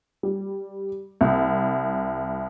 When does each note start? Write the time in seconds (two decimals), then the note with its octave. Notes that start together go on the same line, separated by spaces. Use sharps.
0.23 G3
1.21 C2